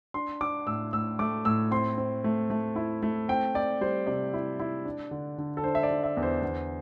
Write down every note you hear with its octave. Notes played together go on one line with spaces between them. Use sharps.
D4 C6
D4 D6
A2 E6
A2 E6
A3 D6
A2 E6
C4 C6
C4
A3
A3
E4
A3
C4 G5
C4 D5
G3 C5
C3 D5
E4
E4
D4
D3
D3
A4
D4 C5
E5
D5
D3
E5
E2
C5
E2